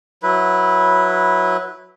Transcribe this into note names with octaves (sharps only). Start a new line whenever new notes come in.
F#3 E4 B4